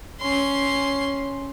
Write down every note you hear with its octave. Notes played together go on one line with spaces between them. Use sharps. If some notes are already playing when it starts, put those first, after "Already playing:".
C#4 C6